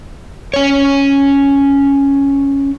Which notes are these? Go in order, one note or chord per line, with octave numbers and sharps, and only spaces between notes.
C#4 C#5